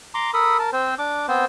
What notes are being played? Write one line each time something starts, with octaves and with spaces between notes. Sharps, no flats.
A#5 C6 D6
A4 A#4 B5 D#6
A#4 A5
C4 C5
D4 D6
B3 C4 C5